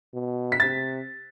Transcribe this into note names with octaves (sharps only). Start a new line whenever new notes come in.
B2
B6
C3 A6